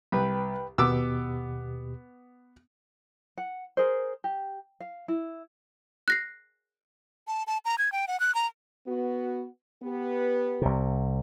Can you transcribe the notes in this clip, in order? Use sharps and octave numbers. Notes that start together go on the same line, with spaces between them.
C2 B4 G5 B5
D#2 B2 B3 G4 D6 E6
F#5
G#4 A#4 C5
G4
F5
E4
F#6 A#6 C7
A5
A5
A#5
G#6
G5
F#5
F#6
A#5
B3 F#4
B3 G4 B4
C2 C3